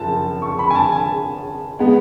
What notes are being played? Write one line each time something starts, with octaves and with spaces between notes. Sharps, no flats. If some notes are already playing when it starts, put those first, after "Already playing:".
Already playing: F#1 F3 A5
C#6
B5
G#5
A5
G#5
G#3 B3